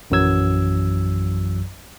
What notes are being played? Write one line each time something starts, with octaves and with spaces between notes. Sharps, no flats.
A#1 F#2 E3 F#3 E6 G#6